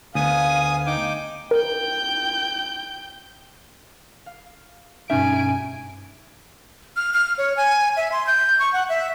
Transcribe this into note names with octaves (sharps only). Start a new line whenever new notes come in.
D2 B3 F5 G#5 D#6
D#4 G5 D6
A#4 G5 G6
F5
G2 B2 G#3 C#4 D#4 E5 G#5 D7
F6
F6
C#5
G#5
E5
C6
G6
C#6
F#5
E5